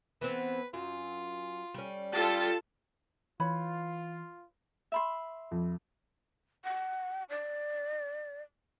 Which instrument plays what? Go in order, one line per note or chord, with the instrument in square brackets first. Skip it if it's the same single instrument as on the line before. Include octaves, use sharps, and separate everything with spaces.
[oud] E3 B3 C4 [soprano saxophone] B4
[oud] F#2 [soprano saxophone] F4
[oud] G3 C#4
[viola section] F4 A4 A5 [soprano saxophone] G4
[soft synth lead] E3 [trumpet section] F4 [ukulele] B4 C#5 B5
[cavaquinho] E5 B5 C6
[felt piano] F2
[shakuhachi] F#5
D5